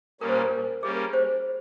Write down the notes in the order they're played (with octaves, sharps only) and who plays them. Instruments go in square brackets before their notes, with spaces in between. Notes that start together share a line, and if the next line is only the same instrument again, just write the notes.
[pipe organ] A#2 G3 A#3 C#4 [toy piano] A#4
[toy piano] C5
A#4
[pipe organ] G3 A#3 C#4 [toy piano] G#4
[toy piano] C5